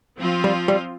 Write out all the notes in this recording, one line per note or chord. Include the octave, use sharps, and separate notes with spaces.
F3 C4 F4
G3
G3